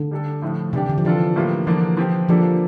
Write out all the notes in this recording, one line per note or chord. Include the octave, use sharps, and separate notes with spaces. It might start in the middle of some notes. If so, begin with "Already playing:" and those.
Already playing: D3
G3 D4 A4
A2 F3 A3
C3 E3 G3 D4 G4
D3
F3
E3 G3 D4 F4 A4
A2 G3 A#3 F4
D3 E3 F3 A#3 D4
F3 C4 G4
D3 F3 G3 A#3 D4 A4